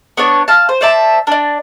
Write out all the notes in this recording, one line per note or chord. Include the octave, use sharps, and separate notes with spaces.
B3 D4 C#5
F5 A5
C5
C5 D5 E5 A5
D4 D5